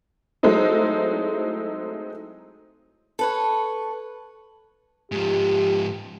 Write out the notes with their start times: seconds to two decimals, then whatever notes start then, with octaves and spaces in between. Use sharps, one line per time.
0.43 F#3 G#3 A3 C4 D#4 E4
3.19 A4 B4 C#5
5.12 G#2 F3 G4